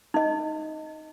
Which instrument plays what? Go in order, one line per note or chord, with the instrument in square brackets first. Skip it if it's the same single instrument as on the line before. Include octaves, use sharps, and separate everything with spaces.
[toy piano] D#4 D#5